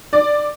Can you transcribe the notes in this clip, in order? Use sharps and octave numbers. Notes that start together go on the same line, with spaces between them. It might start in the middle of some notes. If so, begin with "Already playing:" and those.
D5